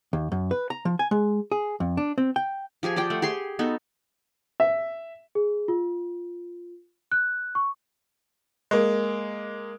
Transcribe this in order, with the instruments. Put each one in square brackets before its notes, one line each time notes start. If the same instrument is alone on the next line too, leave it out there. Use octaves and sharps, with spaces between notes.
[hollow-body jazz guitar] D#2
F#2
B4
A#5
F3
G#5
G#3
G#4
F2
D4
C4
G5
[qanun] F3 G4 G#4 G#5
F4 C5 D5 G5
A3 F#5
G4 G#4 C6 C#6
B3 D#4 F#4 A4
[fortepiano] E5
[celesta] G#4
F4
F#6
C#6
[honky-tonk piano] G#3 A#3